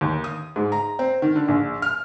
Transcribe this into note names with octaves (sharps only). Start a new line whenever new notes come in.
D#2
D#6
G#2
A#5
C4
D#3
D3
A#1
F6